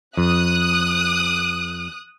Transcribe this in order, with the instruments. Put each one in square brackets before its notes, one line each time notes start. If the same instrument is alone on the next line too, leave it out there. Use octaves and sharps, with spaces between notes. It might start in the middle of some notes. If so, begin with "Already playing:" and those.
[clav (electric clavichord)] F2 [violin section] D#6 F#6